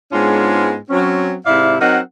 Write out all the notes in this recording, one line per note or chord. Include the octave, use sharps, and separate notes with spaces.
G#2 G#3 B3 C#4 D4 F4
F#3 C4 C#4
G#2 C3 E4 D5 E5 F5
F#3 C4 D#4 A#4 F#5